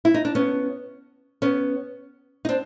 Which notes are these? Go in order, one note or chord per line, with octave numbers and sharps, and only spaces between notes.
E4
D#4
D4
B3 C#4
B3 C#4
D#4
C4 D4